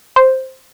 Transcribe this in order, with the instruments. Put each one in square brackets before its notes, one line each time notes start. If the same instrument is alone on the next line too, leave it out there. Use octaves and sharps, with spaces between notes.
[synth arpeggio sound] C5